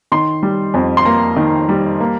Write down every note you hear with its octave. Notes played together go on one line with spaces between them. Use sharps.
D#3 C6
G3
F2
C6
A#3 A#5
D#3
G3
A#3